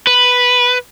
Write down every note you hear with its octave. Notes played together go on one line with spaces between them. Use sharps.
B4